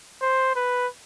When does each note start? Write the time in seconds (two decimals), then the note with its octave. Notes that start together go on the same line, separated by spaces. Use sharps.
0.22 C5
0.56 B4